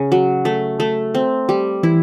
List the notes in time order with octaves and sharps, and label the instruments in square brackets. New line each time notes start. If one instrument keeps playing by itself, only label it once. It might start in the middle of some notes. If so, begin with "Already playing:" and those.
Already playing: [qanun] C#3
F#3
A3
A3
C4
G3
[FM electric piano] E3 [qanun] E4